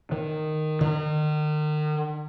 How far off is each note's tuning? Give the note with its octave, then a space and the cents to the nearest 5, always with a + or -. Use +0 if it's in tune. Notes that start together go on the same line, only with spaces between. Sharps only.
D#3 -10
D#3 -40